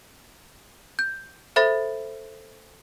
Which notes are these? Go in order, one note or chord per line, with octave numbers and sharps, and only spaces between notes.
G6
A4 C5 E5 B5 A6